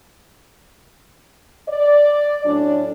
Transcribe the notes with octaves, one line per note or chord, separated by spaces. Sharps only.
D5
A2 F#3 C#4 D4